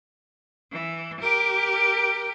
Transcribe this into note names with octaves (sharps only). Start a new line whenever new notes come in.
E3
G4 A#4